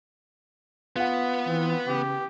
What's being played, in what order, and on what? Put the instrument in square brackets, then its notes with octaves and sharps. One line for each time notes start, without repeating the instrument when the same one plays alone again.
[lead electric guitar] B3 [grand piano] F4 F#5
[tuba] E3 [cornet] C4
[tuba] C#3 [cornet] G4